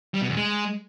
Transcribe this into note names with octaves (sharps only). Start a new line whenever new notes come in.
G3
B2
E2
G#3